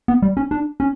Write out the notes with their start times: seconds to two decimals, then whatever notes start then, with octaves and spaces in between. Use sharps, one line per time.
0.08 B3
0.22 G3
0.37 C#4
0.51 D4
0.80 C#4